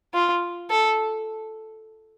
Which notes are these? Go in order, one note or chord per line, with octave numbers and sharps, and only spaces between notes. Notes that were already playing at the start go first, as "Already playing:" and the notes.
F4
A4